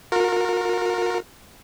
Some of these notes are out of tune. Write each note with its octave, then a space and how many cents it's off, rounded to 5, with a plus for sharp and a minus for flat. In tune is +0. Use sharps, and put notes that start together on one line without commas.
F#4 -45 A#4 -10